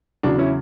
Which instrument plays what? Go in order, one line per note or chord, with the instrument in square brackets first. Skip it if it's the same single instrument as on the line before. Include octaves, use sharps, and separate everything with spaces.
[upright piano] E2 C#3 F#3 D4 F#4
C#4 E4